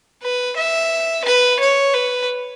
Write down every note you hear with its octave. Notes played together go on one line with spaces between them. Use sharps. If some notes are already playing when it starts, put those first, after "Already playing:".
B4
E5
B4
C#5
B4